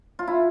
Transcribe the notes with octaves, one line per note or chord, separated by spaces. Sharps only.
F4
E4